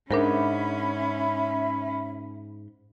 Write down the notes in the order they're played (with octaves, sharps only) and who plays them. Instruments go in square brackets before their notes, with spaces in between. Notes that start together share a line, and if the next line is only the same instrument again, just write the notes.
[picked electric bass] G#2 [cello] C#4 [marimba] D4 A#4 C5 [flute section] E5 B5